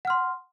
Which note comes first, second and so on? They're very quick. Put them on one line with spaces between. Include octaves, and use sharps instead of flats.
F#5 F6 C6